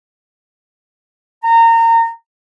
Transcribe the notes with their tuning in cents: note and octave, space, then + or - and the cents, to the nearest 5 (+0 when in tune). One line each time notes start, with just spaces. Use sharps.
A#5 -25